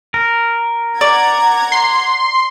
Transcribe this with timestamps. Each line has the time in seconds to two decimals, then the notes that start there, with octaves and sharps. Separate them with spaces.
0.14 A#4
1.01 D5 F#5 A#5 G#6
1.72 C6